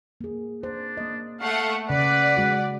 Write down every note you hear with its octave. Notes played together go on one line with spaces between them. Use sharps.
A#3 G#4
D4 C5
A#3 D#5
A3 F5 F#5
C#3 B4 D5 F#5
G#3 F#4